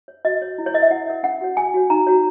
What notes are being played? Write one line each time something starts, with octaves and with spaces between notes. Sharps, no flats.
C#5
F#4 D#5
C#5
E4
C#5
A#4 C#5 D#5 E5
E4 F#5
A#4 C#5
C#4 F#5
F#4 C#5
C#4 G#5
F#4 C#5
D#4 A#5
F#4 C#5